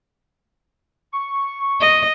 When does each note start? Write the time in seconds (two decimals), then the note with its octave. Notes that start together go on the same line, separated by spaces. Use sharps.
1.13 C#6
1.81 D#5